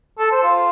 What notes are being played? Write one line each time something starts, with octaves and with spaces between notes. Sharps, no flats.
A4
C5
F4